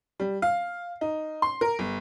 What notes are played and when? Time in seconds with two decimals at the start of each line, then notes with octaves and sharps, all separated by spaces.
0.20 G3
0.42 F5
1.01 D#4
1.42 C6
1.61 A#4
1.79 G1